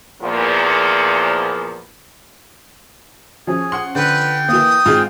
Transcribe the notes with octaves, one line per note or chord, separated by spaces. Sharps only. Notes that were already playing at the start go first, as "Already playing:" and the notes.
E2 A#2 F3
F3 C#4 G#4
F#5 C6
D3 B4 G5
E3 A#3 D#6
G#2 G#3 C4 F4 G#4